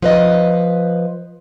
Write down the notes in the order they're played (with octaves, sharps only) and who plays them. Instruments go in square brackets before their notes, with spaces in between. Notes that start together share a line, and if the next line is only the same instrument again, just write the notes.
[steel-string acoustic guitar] F3 B4 D#5